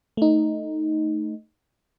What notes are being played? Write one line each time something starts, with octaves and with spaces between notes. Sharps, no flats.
A3 D#4